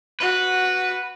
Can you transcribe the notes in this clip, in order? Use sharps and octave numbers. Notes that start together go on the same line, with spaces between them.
F#4 B4